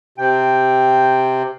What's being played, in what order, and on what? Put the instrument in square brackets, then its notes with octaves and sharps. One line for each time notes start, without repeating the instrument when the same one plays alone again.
[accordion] C3 [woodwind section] G5